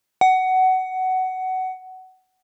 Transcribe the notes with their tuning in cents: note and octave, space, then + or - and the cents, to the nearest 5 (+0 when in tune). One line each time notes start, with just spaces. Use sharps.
F#5 +15